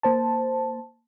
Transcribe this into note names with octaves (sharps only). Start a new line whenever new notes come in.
A#3 C5 A5